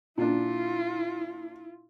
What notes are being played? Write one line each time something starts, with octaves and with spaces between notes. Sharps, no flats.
A#2 D4 E4 F4